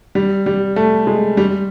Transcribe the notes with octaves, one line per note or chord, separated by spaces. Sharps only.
G3
G3
A3
G#3
G3